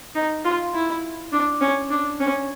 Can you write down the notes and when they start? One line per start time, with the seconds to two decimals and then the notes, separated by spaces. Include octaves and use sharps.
0.15 D#4
0.44 F4
0.74 E4
1.32 D4
1.61 C#4
1.90 D4
2.20 C#4